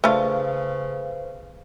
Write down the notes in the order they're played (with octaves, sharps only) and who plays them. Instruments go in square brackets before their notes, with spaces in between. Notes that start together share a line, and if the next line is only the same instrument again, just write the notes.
[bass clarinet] C#3 [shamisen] A3 D4 F4 [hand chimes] B4 C5 F5